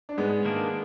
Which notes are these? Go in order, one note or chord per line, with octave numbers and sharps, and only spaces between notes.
D4
G#2 G#3 B3
D#3 A#3 D4